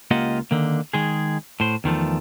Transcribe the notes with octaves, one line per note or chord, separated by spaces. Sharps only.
C#2 A#3 F4 G4 D#5 F#5
D3 D#3 A#3
D#3 G#3 G#4
A2 C5
E2 D#3 F3 A3